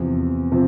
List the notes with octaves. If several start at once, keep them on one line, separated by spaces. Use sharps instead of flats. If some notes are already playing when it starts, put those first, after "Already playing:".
Already playing: E2 C3 F3
C3 F3